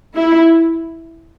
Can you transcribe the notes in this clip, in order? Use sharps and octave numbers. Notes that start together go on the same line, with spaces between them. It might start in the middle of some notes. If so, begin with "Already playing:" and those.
E4